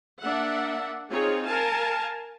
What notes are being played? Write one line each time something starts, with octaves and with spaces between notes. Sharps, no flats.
A#3 D4 E5 F#5
C4 D#4 F4 G#4 C#5
A#4 F5 G#5 A5